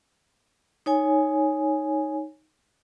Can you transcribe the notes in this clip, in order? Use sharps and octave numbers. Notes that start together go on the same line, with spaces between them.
D#4 C#5 G#5